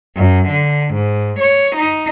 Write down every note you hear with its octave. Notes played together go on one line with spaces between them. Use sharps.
F#2
D3
G#2
C#5
D#4